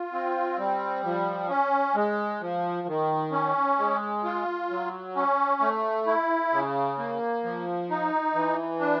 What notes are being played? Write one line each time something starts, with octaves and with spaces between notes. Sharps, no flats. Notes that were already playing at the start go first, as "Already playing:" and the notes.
Already playing: F4
C4
G3
F3
C#4
G#3
F3
D#3
C#4
G#3
F4
F#3
C#4
A3
E4
C#3
A#3
F3
D#4
E3
D4